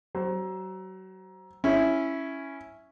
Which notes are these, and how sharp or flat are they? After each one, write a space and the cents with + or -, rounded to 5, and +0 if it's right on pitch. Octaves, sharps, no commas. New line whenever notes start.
F#3 +30 C5 +5
C#4 +0 E4 +0